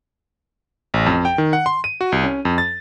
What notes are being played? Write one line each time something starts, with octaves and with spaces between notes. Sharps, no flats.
A1
F2
G5
D#3
F#5
C6
D#7
F#4
C2
C#4
F2
A6